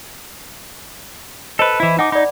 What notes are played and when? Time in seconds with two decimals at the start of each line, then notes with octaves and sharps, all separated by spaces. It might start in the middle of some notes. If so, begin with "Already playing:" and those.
1.59 A4 B4 C5 D#5
1.80 E3 E4
1.99 D#4 F#5 G#5 D6
2.12 D#4 D5 B5